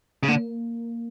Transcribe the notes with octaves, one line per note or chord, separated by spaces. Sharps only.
C#3
D3 A#3